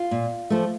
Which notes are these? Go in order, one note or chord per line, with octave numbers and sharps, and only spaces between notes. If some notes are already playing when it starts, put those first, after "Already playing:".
Already playing: F4
A#2
F3 A3